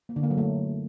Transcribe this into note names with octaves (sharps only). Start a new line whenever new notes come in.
A#3
D3
A#3
F#3
A3